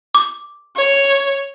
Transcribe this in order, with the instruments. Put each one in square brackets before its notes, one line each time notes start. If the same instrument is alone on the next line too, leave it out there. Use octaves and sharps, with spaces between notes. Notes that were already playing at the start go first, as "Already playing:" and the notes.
[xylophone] D6
[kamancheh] C#5